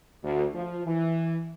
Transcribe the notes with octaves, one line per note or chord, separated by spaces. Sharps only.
D2
F3
E3